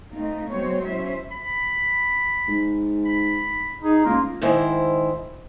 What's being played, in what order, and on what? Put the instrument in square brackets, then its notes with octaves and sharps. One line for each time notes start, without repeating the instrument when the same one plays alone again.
[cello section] A3 C4 D#4 F4
F#3 G#3 B3 C4 C5 C#5
C#4 E4 C5 E5
[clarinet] B5
[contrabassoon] G#2
[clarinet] B5
[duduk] D#4 [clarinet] G#4
[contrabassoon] C#2 [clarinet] A#3 [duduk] F4
[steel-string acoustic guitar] G#2 D#3 E4 C5